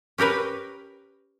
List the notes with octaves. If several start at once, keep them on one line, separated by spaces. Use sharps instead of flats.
C#4 G4 A#4 B4